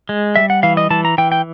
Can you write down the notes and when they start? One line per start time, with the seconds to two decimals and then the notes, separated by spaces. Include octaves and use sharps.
0.09 G#3
0.36 G3 E5
0.50 F#5
0.63 E3 F5
0.77 D#5
0.90 E3 A5
1.05 A#5
1.18 E3 G5
1.32 G5